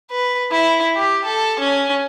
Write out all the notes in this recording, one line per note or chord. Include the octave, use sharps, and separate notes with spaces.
B4
E4
G4
A4
C#4